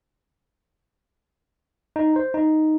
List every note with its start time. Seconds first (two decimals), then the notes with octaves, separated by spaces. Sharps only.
1.96 D#4
2.16 C5
2.34 D#4